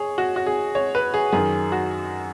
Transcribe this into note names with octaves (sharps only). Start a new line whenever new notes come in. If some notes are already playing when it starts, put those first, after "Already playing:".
Already playing: G#4 C#5
F#4
F#4
G#4
C#5
B4
G#4
F#2 D#3 G#4
F#4